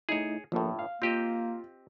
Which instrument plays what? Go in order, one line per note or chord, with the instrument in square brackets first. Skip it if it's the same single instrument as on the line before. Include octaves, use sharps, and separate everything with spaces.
[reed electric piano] A3 D#4 E4 [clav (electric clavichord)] G#4 C#5
[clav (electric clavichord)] G1 A2 [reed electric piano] F3 A#3 A4
[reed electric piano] F5
[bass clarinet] A#3 [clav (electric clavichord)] C4 G4 D#5 [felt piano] F4